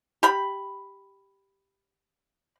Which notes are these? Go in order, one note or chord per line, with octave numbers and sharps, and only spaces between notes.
G4 B5